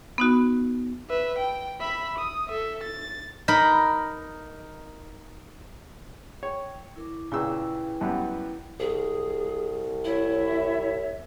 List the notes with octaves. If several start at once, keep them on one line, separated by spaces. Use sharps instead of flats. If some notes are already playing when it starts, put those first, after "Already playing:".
B3 D#4 F#4
B4 E5
G5
E5 B5
D#6
A4 E5
A6
D#4 A#4 B5
C#5 G5
E4 A#4 D6
A#2 C#3 E4 B4 G5 E6
F#2 G3 B3
C2 G#4
E4 C#5 E5